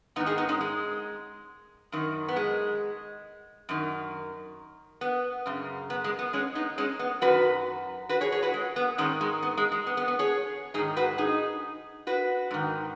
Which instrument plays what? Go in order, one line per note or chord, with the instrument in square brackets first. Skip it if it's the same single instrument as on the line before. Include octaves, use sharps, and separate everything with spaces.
[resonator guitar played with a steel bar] G#2 B3 D#4
D#3
D#4 G#4
B3 D#4
G#3 C#4
G#3
F#2 D#3
B3
G#3
F#2 D#3
B3
F#2 C#3
B3
G#3
B3
G#3 C#4
B3 D#4
G#3 C#4
B3
F#2 D#3 F#4 B4
F#4 B4
G#4 C#5
G#4 C#5
F#4 B4
G#3
B3
G#2 D#3 G#3 C#4
G#3
B3
G#3
G#3
B3
B3
B3
G#4 C#5
G#2 D#4 G#4
D#3
F#4 B4
D#4 G#4
F#4 B4
G#2 D#3